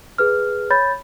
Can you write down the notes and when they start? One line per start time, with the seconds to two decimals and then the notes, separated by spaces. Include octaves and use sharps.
0.18 G#4 B4 F6
0.70 C#5 B5 G6 A6